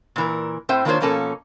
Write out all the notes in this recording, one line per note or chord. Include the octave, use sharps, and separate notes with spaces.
A#2 E3 A#4
A2 C4 C5 E5 G5
D#3 A#3 D4 F4 C5 C#5
B2 F3 A#3 C#4 A4